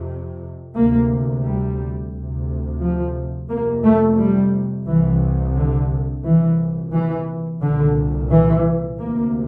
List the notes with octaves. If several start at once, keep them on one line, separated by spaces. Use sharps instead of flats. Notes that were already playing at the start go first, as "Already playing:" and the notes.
Already playing: F2 C3
D2 C3 A#3
G3
D2 C3
F3
F2 C3 A#3
A3
G3
C2 C3 E3
D3
C2 A#2 E3
E3
C2 A#2 D3
E3
D2 C3 A#3